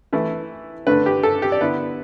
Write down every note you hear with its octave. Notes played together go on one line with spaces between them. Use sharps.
E3 A3 E4
D3 A3 D4 B4
G4
A4
G4
D5
D3 B3 E4 B4